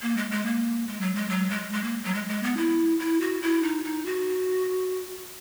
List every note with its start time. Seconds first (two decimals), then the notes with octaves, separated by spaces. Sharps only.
0.02 A#3
0.17 G#3
0.31 G#3
0.46 A#3
0.87 G#3
1.01 F#3
1.15 G#3
1.29 F#3
1.51 G#3
1.73 G#3
1.84 A#3
2.04 F#3
2.15 G#3
2.29 G#3
2.43 B3
2.57 E4
2.99 E4
3.21 F#4
3.42 E4
3.63 D#4
3.84 D#4
4.06 F#4